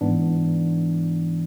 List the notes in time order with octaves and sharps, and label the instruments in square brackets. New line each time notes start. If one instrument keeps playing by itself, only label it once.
[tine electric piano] G#2 E3 B3 D4